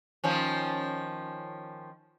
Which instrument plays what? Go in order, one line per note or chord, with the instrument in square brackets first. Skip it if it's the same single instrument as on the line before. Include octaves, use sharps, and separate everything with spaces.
[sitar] D#3 F3 C#4